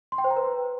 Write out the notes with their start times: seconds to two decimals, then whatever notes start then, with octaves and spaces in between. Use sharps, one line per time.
0.12 C6
0.18 G5
0.24 C5
0.30 A#5
0.37 B4